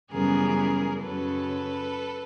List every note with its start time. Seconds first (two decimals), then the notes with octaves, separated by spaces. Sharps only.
0.12 F#2 C#3 E3 G3 B3 G#4 A#4
1.01 F#2 C#3 F#3 A4 B4